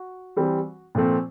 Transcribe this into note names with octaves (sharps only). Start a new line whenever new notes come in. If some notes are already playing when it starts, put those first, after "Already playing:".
Already playing: F#4
E3 G3 C4
A#2 F3 A3 C4